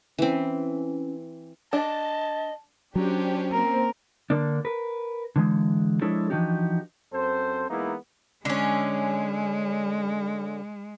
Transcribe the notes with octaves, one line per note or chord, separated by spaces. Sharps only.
E3 C4 C#4
D4 D#5 A5
F#3 C#4 D4 G4 C5
A#3 C4 A#4
D3 A#3 D4
A#4 B4
D3 E3 G#3
F3 G#3 D4 E4 A4 C#5
E3 F3 D4 D#4 F#4 G4
F#2 C4 A4 C5
E3 G#3 A#3 B3 D#4 E4
D3 G#3 C#4